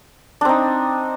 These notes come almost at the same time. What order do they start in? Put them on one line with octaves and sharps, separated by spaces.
D4 C4 D#4